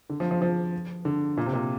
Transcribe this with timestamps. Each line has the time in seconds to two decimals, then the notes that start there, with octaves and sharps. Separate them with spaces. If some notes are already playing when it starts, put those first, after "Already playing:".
0.10 D3
0.20 F3
0.31 F3
0.42 F3
1.05 D3
1.37 A#2
1.46 C3
1.53 A#2